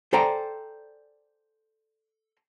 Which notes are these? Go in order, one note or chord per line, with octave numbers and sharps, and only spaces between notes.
A4 C5 D5 G5 G#5 A#5